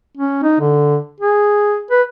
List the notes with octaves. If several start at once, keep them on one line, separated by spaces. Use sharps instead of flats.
C#4
D#4
D3
G#4
B4